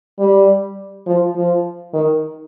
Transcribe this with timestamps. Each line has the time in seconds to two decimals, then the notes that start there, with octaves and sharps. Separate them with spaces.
0.19 G3
1.06 F3
1.35 F3
1.93 D#3